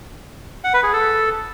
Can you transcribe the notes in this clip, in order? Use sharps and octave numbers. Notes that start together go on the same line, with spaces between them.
F#5
B4
G#4
A4